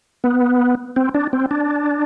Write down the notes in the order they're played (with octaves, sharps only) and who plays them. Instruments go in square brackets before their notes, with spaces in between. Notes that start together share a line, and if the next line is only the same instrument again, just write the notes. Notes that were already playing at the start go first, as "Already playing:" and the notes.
[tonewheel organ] B3
C4
D4
C4
D4